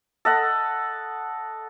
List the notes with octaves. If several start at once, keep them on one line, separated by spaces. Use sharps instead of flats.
A4 D#5 F#5